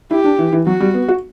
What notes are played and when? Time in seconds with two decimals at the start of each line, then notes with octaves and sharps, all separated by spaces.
0.11 E4 G4
0.24 D4
0.38 E3
0.52 E3
0.67 F#3 F#4
0.80 G3
0.94 B3
1.08 F#4